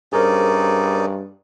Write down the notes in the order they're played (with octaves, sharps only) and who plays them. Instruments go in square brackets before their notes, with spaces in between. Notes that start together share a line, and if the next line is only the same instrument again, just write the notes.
[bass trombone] G2 [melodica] C#4 D#4 D5 [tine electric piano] G#4 A#4 C5